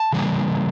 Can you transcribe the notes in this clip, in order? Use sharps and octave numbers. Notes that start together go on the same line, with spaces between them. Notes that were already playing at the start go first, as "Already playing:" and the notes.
Already playing: A5
C#3 E3 G3 A#3